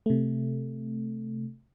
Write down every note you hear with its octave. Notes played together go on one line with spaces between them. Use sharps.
C3 A3